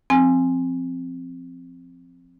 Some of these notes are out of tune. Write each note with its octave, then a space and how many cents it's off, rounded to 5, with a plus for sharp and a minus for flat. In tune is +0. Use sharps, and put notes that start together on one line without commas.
F3 +0 C4 +0 G#5 +0